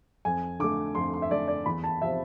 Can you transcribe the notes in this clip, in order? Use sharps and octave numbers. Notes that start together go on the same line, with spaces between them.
F2 G#5
D3 A3 D6
F2 C6
C6
E5
D3 A3 D5
D5
E2 B5
A5
C3 F3 E5